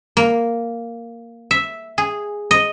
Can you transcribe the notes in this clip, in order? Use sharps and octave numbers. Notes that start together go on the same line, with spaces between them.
A#3
E5
G#4
D#5